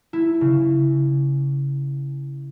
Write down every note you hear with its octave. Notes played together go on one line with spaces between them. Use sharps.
E4
C#3